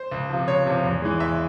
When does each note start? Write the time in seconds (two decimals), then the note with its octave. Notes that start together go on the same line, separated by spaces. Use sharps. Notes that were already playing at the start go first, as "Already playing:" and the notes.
Already playing: C5
0.11 C#2
0.30 C3 F3
0.48 C#2 C#5
0.66 C3 F3
0.84 E2
1.02 E3 G#3
1.20 E2 E5